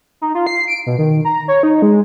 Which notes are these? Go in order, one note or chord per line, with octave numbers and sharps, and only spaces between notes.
D#4
F4
C7
D7
B2
D#3
A#5
C#5
D#4
G#3